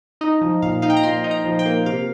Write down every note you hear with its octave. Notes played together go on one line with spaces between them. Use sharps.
D#4 D#5
F3
A#2 F5
D#4 F5
G5
A#5
A#2 C6
D#4
A#5
F3
G5
A#3
C3 F5